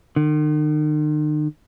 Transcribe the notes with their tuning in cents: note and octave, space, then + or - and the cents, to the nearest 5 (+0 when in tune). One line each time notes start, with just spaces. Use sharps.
D#3 -45